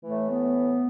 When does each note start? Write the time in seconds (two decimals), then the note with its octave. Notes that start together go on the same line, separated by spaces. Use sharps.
0.04 A2 E3 A3
0.30 B3